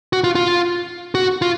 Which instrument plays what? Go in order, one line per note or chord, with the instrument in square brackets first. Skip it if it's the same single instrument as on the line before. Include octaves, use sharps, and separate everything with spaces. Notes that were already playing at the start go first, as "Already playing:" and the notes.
[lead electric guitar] F#4
F4
F4
F#4
F4